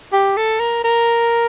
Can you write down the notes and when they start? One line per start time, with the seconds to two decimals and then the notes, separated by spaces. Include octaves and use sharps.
0.13 G4
0.37 A4
0.60 A#4
0.84 A#4